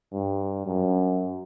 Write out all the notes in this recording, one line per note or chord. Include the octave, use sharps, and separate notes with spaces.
G2
F#2